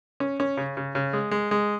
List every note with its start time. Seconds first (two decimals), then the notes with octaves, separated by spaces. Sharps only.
0.20 C#4
0.40 C#4
0.57 C#3
0.77 C#3
0.95 C#3
1.13 G#3
1.31 G#3
1.51 G#3